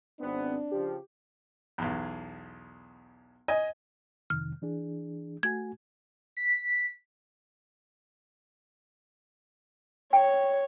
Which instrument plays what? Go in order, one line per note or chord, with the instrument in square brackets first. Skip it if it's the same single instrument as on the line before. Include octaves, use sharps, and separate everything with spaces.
[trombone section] G#1 B3 [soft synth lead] C4 [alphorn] D4
[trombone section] C#3 F3 [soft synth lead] G4
[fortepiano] B1 E2
[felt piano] D#5 [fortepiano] G#5
[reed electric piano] F2 C3 D#3 [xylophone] F6
[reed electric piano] E3 D4 G#4
[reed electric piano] A3 F#4 G#5 [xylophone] G#6
[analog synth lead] B6
[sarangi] C#5 [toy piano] G5